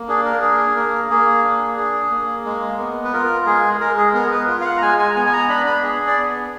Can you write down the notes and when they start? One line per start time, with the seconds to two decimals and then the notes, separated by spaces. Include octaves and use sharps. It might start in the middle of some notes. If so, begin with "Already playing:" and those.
Already playing: A#3
0.08 D4 G#4
0.25 A#4
0.42 G#4
0.76 A#3 A#4
1.10 A#3 G#4
1.43 D4
1.77 G#4
2.11 A#3
2.45 G#3
2.78 B3
3.05 B4
3.13 F4 A#4
3.46 G#3 G#4
3.80 G#3 A#4
3.97 G#4
4.14 B3 A#4
4.31 B4
4.48 F4
4.61 F5
4.65 F#5
4.78 A#5
4.82 G#3 G#5
4.99 G#5
5.10 A#5
5.16 B3 G#5
5.26 G#5
5.33 A#5
5.49 D4 B5
5.67 B5
5.83 G#4
6.06 D5
6.18 B3